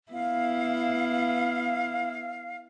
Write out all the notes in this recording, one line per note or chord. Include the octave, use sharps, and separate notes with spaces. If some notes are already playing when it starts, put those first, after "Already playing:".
B3 E4 F5